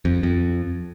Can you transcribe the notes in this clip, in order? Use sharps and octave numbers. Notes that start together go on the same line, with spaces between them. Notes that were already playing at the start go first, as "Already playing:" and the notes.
F2
F2